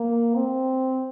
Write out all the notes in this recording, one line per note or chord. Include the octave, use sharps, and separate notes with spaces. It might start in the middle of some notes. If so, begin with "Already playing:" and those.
Already playing: A#3
C4